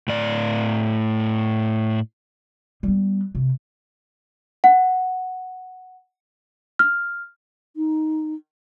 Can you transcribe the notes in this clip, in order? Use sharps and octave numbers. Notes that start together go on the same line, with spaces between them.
A2 D5
G3 B3
C3
F#5
F6
D#4